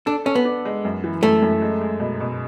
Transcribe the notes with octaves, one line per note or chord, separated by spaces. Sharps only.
D4 A4
C#4 A4
B3
D4
G#3
F#2
E3
F#2 A3
F#2
G#3
G#3
B2
B2